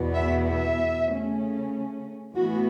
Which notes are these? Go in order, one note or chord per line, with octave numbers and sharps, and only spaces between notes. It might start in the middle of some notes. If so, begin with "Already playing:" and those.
Already playing: E2 B2 B3
E5
E5
C#3 A3 C#4
A2 E3 B3 F#4